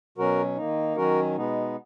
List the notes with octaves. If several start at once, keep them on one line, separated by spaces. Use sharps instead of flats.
B2 F#3 C#4 F#4 A#4
D#3 A#3 D#4
D#3 F#3 C#4 F#4 A#4
B2 G#3 B3 D#4